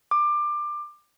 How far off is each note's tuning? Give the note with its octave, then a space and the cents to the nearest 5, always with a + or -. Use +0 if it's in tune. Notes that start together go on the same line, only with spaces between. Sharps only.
D6 +20